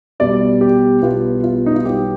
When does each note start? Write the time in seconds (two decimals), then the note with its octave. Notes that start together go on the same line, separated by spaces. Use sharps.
0.20 B1 B2 G3 B3 D5
0.61 G4
1.02 B1 B2 G3 B3 F4
1.43 F4
1.66 D#4
1.76 F4
1.85 B1 B2 G3 B3 G4